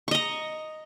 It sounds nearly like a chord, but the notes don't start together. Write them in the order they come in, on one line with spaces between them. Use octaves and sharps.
C#6 D#5 A#5